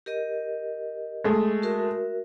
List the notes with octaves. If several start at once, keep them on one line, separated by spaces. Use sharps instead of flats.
G4 A#4 D#5
G#3 A3
F#4 A#4 E5